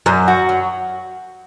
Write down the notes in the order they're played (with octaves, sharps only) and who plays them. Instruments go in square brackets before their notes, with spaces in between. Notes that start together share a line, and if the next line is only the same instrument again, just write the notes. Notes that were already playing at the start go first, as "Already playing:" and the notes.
[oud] F#2 [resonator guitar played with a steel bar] F#3
[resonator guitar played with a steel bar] F#4
F#3